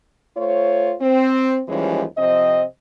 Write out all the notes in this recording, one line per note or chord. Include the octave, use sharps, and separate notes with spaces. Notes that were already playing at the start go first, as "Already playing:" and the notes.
A3 F4 C5 C#5
C4
D#2 E3 F3 G3 G#3 C#4
C3 F3 C4 D#5